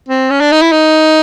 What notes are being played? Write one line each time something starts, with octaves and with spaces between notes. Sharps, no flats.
C4
C#4
D4
D#4
E4
D#4